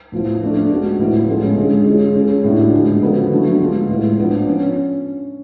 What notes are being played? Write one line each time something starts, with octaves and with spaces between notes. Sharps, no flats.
A2 F3 B3
F3 A3 D4
G#3 B3 D4 F#4
A2 F3 B3
A2 G#3 C#4 F4 A4
D3 G#3 C#4 G#4
G#3 C#4 F4 G#4
G#3 C#4 G#4
A2 G#3 B3 D4 F#4
D3 F3 G#3
C#3 F3 B3 F#4 A4
D3 F#3 A3
G#3 B3 F4
A2 G#3 B3
F3 B3 D4
C#4